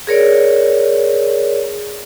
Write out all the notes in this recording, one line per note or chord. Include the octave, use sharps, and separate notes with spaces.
G#4 A#4 C#5 D5